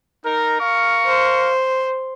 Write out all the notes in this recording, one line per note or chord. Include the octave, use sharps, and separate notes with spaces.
D#4 A#4
A#4 F5 C#6
C5